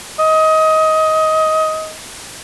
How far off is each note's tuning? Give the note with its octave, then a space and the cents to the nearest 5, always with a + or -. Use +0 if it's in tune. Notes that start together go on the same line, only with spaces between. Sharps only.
D#5 +20